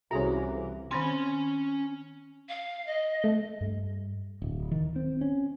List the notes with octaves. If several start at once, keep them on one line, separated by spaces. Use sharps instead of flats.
C2 E3 C#4 F#4 G#4 A4 E5 A#5
D#3 C4 C#4 G#5 C6
F5
D#5
A3
G2
D1
D#3
C4
C#4